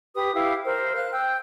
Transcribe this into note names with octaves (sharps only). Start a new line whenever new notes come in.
G4 B4 D#6
E4 G4 F5
A#4 C5
F5 F#6
G5 E6